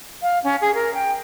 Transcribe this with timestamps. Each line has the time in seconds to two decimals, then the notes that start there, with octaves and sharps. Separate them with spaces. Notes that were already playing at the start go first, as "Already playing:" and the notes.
0.22 F5
0.44 C#4
0.61 G#4
0.74 A#4
0.94 G5